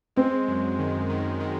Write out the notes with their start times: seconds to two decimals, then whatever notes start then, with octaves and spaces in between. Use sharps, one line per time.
0.16 G#3 C4
0.48 F#2
0.79 D#3
1.10 D#3
1.40 D#3